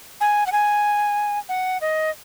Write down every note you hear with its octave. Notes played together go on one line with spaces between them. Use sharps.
G#5
F#5
G#5
F#5
D#5